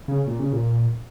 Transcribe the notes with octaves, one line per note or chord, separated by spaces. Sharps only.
C#3
A#2
C#3
A#2